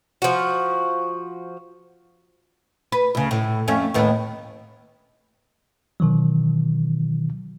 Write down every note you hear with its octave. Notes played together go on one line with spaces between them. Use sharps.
F3 F#4
B4
D2 C#3
A2
F2 A3 C#4
D#2 A2 B3
B2 D#3 E3 F#3